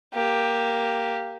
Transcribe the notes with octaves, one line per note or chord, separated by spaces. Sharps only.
A#3 G4